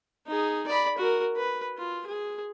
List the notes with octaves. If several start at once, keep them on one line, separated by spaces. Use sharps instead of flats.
D#4 G#4
D5 B5
F#4 A#4
B4
F4
G#4